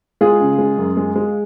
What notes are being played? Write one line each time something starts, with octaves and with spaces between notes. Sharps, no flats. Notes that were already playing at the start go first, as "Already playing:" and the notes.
G#3 F4 G#4
C#3
G#3
F#2
G#3
G#3